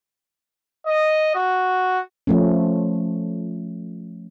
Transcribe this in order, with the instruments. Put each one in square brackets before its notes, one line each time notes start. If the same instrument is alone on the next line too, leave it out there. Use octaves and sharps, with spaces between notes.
[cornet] D#5
F#4
[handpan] F3 A3 C#4